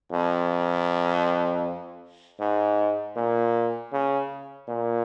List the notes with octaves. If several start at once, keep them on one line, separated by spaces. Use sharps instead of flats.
F2
G#2
A#2
C#3
A#2